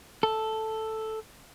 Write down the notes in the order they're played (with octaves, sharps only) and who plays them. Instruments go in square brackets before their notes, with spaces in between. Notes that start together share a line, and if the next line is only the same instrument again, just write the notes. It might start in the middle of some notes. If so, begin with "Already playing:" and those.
[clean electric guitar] A4